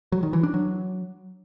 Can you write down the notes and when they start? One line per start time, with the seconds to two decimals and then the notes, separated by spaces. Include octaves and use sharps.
0.12 F#3
0.23 D#3
0.33 E3
0.43 D4
0.54 F#3